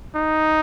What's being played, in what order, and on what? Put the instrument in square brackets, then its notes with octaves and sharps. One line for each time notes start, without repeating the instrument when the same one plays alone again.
[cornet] D#4